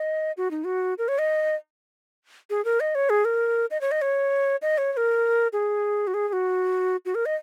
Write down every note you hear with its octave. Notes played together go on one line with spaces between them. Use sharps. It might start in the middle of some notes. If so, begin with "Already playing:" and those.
Already playing: D#5
F#4
D#4
F#4
A#4
C#5
D#5
G#4
A#4
D#5
C#5
G#4
A#4
D#5
C#5
D#5
C#5
D#5
C#5
C#5
A#4
G#4
F#4
G#4
G#4
F#4
F#4
A#4
D#5